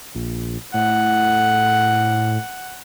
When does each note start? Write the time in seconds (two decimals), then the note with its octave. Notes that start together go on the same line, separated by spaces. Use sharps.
0.15 A#1
0.74 A2 F#5